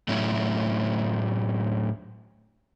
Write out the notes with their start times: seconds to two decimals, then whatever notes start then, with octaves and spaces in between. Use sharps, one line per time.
0.08 A2 F#3 A3 C#4 E4